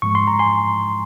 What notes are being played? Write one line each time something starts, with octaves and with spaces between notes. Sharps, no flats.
G#2 F3 G#3 C#6
C6
A#5
G#5 C6